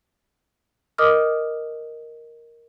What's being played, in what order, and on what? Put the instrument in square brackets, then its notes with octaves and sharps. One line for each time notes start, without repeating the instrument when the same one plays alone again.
[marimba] A#4 D#5 D6 D#6 F6